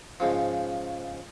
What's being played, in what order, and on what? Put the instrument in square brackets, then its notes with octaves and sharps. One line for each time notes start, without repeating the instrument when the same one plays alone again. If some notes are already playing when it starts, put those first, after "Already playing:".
[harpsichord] G#2 C#3 F3